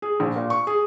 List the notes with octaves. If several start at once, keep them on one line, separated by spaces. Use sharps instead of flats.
G#4
A#1
A#2
C#6
G#4